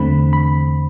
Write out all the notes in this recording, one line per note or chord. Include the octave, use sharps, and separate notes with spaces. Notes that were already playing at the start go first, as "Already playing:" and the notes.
Already playing: E2 D3 A3 C4 B5
B5